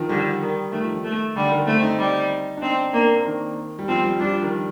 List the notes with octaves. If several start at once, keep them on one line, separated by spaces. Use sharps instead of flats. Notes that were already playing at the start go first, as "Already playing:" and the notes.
Already playing: D#3 F3
D3 G3
D#3
D#3 A3
F3
D#3
A3
D3 G3
D#3
A3 C4
D#4
G3
D4
C4 D#4
D#4
A#3 D4
C4
A#3
D#3
G3
F3 C4
G3
G3 D4
F3
D#3
F3